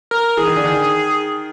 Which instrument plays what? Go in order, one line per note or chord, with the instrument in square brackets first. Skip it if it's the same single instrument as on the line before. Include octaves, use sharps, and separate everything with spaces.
[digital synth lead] A#4
[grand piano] E3 [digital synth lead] G#4
[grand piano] D#3
D3
D#3